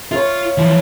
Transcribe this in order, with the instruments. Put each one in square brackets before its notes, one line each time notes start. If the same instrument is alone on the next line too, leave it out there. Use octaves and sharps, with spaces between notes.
[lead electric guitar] F4 [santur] C#5 F5
[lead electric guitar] E3 F3